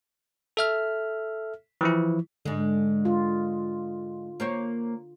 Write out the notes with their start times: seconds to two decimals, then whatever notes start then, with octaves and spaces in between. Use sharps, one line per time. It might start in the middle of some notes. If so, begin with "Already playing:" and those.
0.57 A4 E5 F6
1.81 E3 F3 E4
2.45 G#2 D3 G#3
3.05 F4
4.40 A#3 C5 C#5